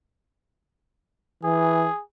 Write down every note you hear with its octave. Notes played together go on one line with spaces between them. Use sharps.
E3 G#4